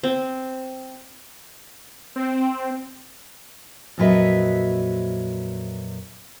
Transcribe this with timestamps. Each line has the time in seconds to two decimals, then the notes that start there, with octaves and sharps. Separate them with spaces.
0.03 C4
2.16 C4
3.98 F2 A#2 F#3 B4 D#5 E5